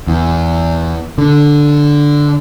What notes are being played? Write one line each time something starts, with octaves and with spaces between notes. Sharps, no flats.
E2
D3